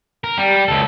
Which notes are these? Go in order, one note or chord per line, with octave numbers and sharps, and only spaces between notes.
A#4
G3
C#2 A4